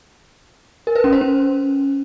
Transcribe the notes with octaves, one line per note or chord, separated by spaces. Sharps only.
A#4
B4
C#4
C5
C#4